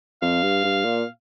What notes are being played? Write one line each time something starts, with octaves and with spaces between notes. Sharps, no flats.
F2 F5
G2
G2
A#2